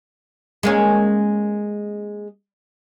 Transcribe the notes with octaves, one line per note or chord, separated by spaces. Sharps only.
G#3 A#3 C#4